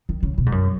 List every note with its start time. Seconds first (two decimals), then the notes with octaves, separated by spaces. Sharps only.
0.09 D#3
0.23 C#3
0.38 B2
0.46 G#2
0.52 F#2